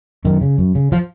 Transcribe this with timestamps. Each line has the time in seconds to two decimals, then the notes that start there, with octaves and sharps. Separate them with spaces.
0.25 F#2 D#3
0.41 C#3
0.58 F#2
0.75 C#3
0.92 F3